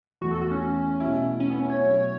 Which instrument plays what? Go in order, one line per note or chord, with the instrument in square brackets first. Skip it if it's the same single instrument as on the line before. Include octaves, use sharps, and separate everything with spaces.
[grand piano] E2 E3 A3 [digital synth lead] F#4
[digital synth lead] A4
F#4
C#4
[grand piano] B2 A3 E4
[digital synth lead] C#4
B3
C#4
C#5
[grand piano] B2 F#3 C#4 E4